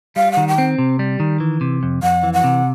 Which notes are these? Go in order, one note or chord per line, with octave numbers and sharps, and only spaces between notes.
G3 F5
F#5
D#3
G5
C4
C3
G3
D#3
E3
C3
F2
F2 F#5
E3
F#5
C3